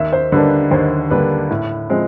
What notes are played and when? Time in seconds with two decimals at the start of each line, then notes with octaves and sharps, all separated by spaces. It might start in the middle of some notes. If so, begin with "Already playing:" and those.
Already playing: D#2 E5
0.13 C5
0.32 D3 G3 A#3 D4 B4
0.71 D#2 C5
1.10 D3 G3 A#3 D4 B4
1.50 A2
1.90 F3 G#3 C4